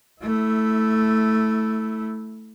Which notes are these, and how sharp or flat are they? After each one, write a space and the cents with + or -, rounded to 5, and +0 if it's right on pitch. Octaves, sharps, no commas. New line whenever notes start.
A3 +0 E4 -10